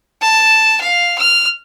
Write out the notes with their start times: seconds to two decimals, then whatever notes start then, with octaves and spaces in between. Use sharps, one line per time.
0.22 A5
0.81 F5
1.18 F6